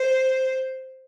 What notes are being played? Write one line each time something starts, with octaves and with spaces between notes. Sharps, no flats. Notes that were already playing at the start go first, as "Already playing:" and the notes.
Already playing: C5